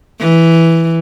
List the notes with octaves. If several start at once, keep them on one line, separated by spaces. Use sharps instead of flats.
E3